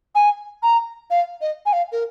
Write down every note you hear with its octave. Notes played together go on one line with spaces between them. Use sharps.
G#5
A#5
F5
D#5
G#5
F5
A#4